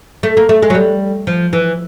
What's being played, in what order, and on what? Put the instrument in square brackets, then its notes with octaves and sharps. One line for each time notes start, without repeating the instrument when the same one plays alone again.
[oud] A3
A#3
A3
G#3
F#3
G3
F3
E3